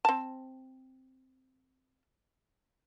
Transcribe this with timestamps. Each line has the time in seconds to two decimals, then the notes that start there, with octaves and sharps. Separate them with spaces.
0.05 C4 A5